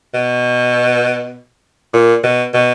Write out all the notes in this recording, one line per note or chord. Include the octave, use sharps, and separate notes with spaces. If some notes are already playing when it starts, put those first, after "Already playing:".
B2
A#2
B2
B2